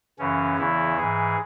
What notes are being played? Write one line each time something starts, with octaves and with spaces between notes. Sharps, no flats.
F#2 C#3 E3 C#4
E2 C#3 E3 E4
G#2 E3 G#4